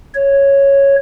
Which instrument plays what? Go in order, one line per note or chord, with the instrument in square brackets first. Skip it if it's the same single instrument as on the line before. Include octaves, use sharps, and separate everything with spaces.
[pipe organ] C#5